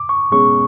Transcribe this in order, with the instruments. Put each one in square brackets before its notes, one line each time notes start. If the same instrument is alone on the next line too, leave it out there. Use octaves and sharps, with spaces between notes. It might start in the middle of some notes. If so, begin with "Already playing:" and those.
Already playing: [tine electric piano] D6
C#6
[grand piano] B2 G#3 C#4 [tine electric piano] C#6